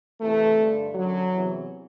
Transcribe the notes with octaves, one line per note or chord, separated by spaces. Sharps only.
E2 C3 E3 A3
G2 D3
F#2 D3 F#3
E2 C3 E3